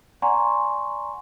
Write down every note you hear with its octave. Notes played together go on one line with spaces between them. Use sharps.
D5 F#5 G#5 A#5 C6 C#6